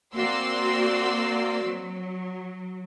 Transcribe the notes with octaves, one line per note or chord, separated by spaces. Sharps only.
A#3 C4 F#4 D5 C6 E6
F#3